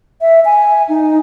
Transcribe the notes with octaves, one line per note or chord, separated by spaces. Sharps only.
E5
G#5
D#4